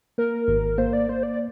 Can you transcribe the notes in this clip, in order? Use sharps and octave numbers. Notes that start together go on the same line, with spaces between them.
A#3 A#4
G#1
A#3 C5
D5
A#3 C5
D5